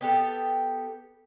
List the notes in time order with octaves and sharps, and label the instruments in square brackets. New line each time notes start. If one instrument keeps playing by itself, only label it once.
[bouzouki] B3 G4 A4